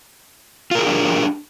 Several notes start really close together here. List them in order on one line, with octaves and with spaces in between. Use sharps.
F4 A#4 G#4 G4 D4